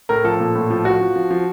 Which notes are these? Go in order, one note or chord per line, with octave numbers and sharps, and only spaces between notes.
A2 A#4
F3 A4
A#2
A2
F3
F3 F#4
F3
F3
F3